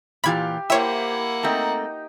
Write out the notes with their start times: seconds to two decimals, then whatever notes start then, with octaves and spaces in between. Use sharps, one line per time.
0.24 A#2 E3 F4 G4 F5 B5 G#6
0.70 A#3 E4 C5 C#5 E5 F#5 G5
1.43 A3 C4 D#4 G5 A#5